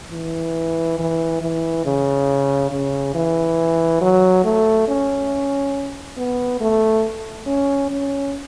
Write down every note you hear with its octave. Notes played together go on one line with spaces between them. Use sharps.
E3
E3
E3
C#3
C#3
E3
F#3
A3
C#4
B3
A3
C#4
C#4